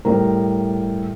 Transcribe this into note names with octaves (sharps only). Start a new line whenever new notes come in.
A2 G3 A#4